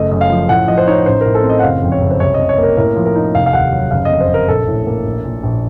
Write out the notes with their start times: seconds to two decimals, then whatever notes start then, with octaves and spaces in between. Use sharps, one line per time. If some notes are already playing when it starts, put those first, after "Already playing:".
Already playing: F#1 A3 D#5
0.11 F#2 D#5
0.21 F5
0.30 F3
0.49 A2 F#5
0.68 F3 D#5
0.78 C5
0.87 D#4 C#5
1.06 A1 C5
1.21 A2 A#4
1.35 A4
1.44 C4
1.50 D#5
1.59 F#5
1.63 F#1 F5
1.82 F2
1.92 C#5
2.01 F#1
2.11 C5
2.20 C2 C#5
2.34 D#5
2.39 C3
2.49 C#5
2.58 A#3 A#4
2.77 A2 A#4
2.96 F3
3.05 A#4
3.15 D#4
3.35 F1 F5
3.46 F5
3.53 D#2 F#5
3.72 F#3
3.91 F#1 F5
4.05 F2 D#5
4.20 C5
4.29 F#1 A#4
4.48 A#1 A4
4.68 A2
4.87 A#3
5.06 A#1
5.24 A#2
5.43 A#1